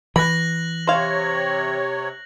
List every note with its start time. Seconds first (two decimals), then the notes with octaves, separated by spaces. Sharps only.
0.16 E3 B5 F#6 A#6 F#7
0.87 C3 C5 C#5 F5